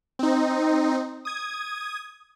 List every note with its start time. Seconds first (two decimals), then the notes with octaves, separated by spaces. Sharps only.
0.19 C4 D#4
1.25 D#6 G#6